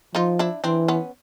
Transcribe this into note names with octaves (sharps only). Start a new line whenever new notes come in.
F3 D#4 F4
D4 E4
E3 C4 D4
B3 C#4